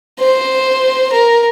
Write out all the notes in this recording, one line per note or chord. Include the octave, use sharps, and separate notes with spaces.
C5
A#4